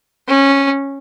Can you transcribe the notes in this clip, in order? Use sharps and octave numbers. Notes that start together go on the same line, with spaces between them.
C#4